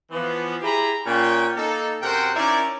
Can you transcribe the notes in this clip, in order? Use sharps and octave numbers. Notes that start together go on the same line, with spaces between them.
E3 F3 B3
E4 G4 G#4 A#5 B5
A#2 C#4 G5
A#3 D#4 A4
F#2 C3 A#4 C5 F#5 G5
C#4 D#4 E4 A#4 D5